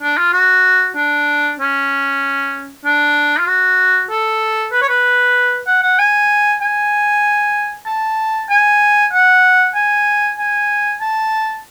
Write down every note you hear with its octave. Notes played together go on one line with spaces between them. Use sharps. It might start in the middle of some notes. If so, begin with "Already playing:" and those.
D4
F4
F#4
D4
C#4
D4
F4
F#4
A4
B4
C#5
B4
F#5
F#5
G#5
G#5
A5
G#5
F#5
G#5
G#5
A5